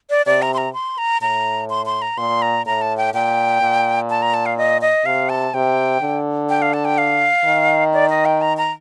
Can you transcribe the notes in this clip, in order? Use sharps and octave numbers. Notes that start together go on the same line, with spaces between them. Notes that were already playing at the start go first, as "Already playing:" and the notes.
D5
C3 D5
A#5
C6
A#5
C6
A#5
A2 A#5
C6
C6
A#5
A#2 C6
A#5
A2 A#5
A5
G5
A#2 G5
A#2
A5
A#5
A5
F5
D#5
D#5
C3 F5
A5
C3 G5
D3
G5
F5
A5
G5
F5
D#3
D5
D#5
G5
A#5
A#5